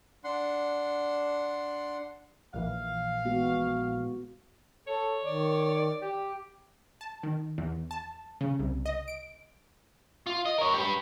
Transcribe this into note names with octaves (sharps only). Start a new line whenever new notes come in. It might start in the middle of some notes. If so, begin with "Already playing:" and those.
D4 F#5 C6
A#1 A#2 E3 F5
G#3 B3 F#4
A4 C#5
D#3 D5
G4
A5
D#3
E2
A5
C#3
C2
D#5
D7
F4
D#5
A#4 C#5
G4 B4